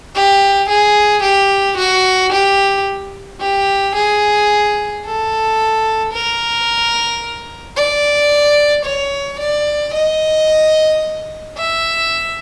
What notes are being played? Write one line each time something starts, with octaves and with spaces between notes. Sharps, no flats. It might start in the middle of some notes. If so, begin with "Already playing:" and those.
G4
G#4
G4
F#4
G4
G4
G#4
A4
A#4
D5
C#5
D5
D#5
E5